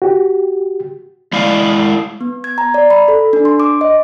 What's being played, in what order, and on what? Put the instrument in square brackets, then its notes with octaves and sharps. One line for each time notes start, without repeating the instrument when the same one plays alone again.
[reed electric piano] F#4 G4
[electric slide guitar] G#3 E4 D5 F5
[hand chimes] B3
G#6
A#5
D5
B5
A4
D4
C6
D6
D#5